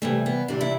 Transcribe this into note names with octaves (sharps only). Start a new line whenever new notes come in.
C3 E3 G3 A3
B3
C3 E3 G3 D4
E4